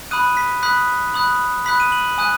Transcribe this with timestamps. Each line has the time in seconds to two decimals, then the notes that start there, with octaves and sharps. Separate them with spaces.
0.11 B5 D#6 F#6 D#7
0.37 B6
0.63 B5 D#6 F#6 B6
1.14 B5 D#6 F#6
1.66 B5 D#6 F#6 B6
1.80 D#7
1.92 F#7
2.18 G#5 D#6 F#6 D#7